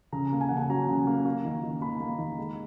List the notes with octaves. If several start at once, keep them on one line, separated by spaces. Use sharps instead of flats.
C#3 A#5
A#3
G#5
C#3 F#5
G#5
F#3 A#5
C#3
A#3
A#3
D#3
D#3
A#3 B5
A#3
D#3
G#3